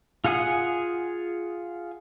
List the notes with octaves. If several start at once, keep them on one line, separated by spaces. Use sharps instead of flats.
F4 G#4 F#5 G#5 D#6